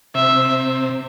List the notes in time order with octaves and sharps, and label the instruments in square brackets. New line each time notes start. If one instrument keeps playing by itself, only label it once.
[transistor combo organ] C3 [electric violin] E5